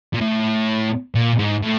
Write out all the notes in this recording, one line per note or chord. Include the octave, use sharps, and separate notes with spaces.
A#2
A2
A#2
G#2
A2